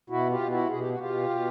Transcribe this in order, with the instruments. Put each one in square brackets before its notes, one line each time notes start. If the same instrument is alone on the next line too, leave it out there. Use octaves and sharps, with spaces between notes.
[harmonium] B2 E4 F#4
F4 G4
B2
E4 F#4
B2 G#4
G4
F#4
B2 F4 G4
B2